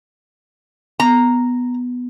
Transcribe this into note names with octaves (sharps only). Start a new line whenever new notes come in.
B3 A#5